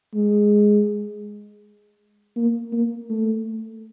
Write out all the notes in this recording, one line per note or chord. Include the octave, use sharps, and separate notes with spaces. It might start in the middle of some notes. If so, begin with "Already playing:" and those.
G#3
A#3
A#3
A3